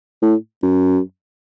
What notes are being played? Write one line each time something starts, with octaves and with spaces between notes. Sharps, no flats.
A2
F#2